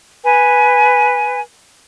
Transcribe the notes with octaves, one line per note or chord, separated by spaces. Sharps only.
B4 G#5